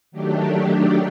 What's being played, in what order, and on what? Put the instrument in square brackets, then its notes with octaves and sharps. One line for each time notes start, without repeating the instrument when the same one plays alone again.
[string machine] D#3 F#3 A3 D4 G4